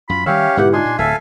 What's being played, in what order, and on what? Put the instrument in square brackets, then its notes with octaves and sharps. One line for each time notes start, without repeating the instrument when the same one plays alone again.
[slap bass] F#2 [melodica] F4 [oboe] B5
[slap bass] D#3 G3 [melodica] C#4 G4 C#5 [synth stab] E5 [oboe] F5
[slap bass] G#2 B2 D3 [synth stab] B3 E4 G4 [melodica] F#5
[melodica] D4 C6 [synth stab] D#4 F4 [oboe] G#5
[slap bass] A#2
[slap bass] D1 [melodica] A4 F5 G#5 [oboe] E5